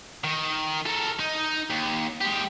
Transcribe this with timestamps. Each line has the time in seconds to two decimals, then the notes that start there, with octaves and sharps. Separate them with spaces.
0.24 D#3
0.86 A4 A#4
1.19 D#4
1.70 D#2
2.21 G#3 G4